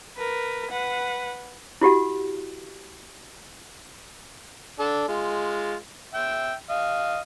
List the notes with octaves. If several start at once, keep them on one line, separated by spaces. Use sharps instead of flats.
A#4 B4
B4 F#5
E4 F#4 G4 F#5
D4 A4
G#3 F4
E5 G5
D#5 F5